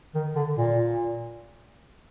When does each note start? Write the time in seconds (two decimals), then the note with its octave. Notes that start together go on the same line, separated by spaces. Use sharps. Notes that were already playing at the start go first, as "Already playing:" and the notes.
0.15 D#3
0.36 D3
0.58 A#2